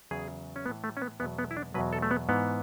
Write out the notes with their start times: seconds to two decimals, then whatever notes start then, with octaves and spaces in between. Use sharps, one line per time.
0.11 E2 C#3 F#3 G#4
0.56 C#4
0.66 E3 B3
0.69 A2
0.84 A3
0.97 C#4
1.02 B3
1.20 E2 B2 F#3 B3
1.38 B3
1.51 E4
1.57 D4
1.74 E2 B2 F#3 B4
1.93 A4
2.02 A3
2.11 B3
2.29 G#2 E3 B3